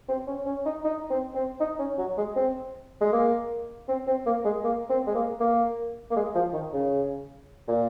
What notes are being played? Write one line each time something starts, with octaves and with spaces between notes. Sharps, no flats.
C4
C#4
C#4
D#4
D#4
C4
C4
D#4
C#4
F#3
G#3
C4
G#3
A#3
C4
C4
A#3
G#3
A#3
C4
G#3
A#3
A#3
A#3
G#3
F3
D#3
C#3
A#2